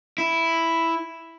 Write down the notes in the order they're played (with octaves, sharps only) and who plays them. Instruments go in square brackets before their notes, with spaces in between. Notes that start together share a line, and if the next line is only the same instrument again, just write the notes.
[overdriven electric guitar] E4